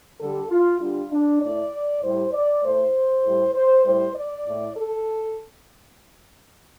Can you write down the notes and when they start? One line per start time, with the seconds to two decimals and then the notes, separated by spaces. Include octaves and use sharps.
0.20 D3 G3 A4
0.50 F4
0.81 D3 G3 F4
1.12 D4
1.42 A2 A3 D5
2.03 A2 G3 C5
2.33 D5
2.64 A2 A3 C5
3.24 A2 G3
3.55 C5
3.85 A2 G3 C5
4.15 D5
4.46 A2 A3
4.76 A4